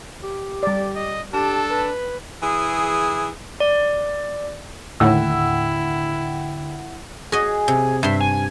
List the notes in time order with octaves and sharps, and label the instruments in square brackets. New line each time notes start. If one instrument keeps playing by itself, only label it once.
[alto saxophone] G4
[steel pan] G3 D5
[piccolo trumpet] D#5
[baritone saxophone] D4 [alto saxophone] G4 [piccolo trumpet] A4
[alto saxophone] B4
[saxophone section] E3 G#4
[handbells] D5
[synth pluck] D#2 A2 [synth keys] D3 G5 [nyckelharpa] E4 [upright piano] F#5 E6
[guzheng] F#4 D#5 [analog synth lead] G#4
[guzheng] C3
[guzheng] G2 C6 [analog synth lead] E5
[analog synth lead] G#5